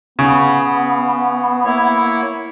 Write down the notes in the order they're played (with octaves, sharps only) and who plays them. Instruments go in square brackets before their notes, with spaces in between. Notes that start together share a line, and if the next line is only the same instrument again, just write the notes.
[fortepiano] C#3 [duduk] B3
[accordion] A#3 E4 C#5